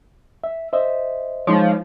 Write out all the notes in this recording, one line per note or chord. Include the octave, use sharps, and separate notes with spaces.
E5
C5 D#5 E5
F3 G#3 D#4 C#5